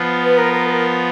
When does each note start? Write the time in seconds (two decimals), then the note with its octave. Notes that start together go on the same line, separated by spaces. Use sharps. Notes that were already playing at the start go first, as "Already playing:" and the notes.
Already playing: F3 B3 F4
0.23 B4
0.38 A#4
0.53 A#4
0.69 A#4